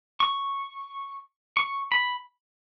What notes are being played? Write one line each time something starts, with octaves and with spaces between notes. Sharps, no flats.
C#6
C#6
B5